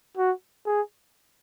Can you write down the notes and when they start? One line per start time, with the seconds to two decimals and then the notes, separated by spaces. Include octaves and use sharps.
0.17 F#4
0.66 G#4